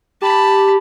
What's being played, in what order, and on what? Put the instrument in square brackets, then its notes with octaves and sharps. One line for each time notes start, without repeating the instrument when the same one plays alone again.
[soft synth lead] G4 [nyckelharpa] A5 B5